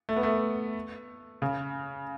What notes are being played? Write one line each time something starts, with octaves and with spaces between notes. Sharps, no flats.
A3
B3
A3
C#3